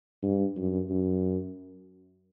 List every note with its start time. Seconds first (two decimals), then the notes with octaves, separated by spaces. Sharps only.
0.22 G2
0.57 F#2
0.90 F#2